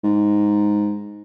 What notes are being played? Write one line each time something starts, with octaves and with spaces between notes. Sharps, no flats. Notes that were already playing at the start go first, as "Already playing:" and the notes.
G#2